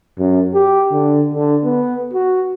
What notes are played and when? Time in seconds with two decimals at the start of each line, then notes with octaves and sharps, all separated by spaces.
0.19 F#2
0.55 G4
0.93 D3
1.34 D3
1.64 B3
2.14 F#4